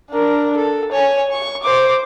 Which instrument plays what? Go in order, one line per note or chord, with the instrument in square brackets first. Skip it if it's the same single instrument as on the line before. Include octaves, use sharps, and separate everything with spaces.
[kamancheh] D4 A#4
A4
C#5 G#5
C#6
C5 D6